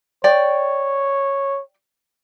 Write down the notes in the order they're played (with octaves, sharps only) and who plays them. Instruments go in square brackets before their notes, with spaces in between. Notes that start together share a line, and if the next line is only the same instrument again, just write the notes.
[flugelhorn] C#5 [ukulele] D5 G5